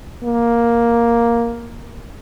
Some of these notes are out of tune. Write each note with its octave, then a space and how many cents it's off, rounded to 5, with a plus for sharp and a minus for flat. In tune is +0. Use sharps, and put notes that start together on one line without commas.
A#3 +5